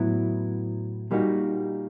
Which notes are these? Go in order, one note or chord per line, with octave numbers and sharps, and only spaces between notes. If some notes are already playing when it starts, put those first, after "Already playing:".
Already playing: A2 F#3 B3 E4
A#2 G3 A#3 D#4 F#4